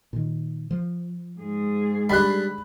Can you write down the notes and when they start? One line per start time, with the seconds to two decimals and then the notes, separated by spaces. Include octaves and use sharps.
0.13 A#2 D#3
0.71 F3
1.39 G#2 G#4
2.09 G3 D4 B5 F#6